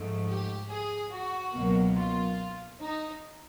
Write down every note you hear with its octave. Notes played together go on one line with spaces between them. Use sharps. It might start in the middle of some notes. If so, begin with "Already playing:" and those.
Already playing: G#2 F3 A3
G4
G#4
F#4
C#2 B2 F#3 A#3
F4
D#4